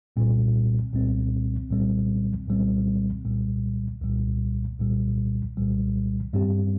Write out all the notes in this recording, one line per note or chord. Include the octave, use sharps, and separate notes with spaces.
C2 A#2 G3 C4
C2 A#2 G3 C4
C2 A#2 G3 C4
C2 A#2 G3 C4
C2 A#2 G3
C2 A#2 G3
C2 A#2 G3
C2 A#2 G3
G2 G3 C4 G4